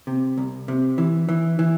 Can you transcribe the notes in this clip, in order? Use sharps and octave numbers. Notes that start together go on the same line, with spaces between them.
C3
C2
C3
E3
E3
E3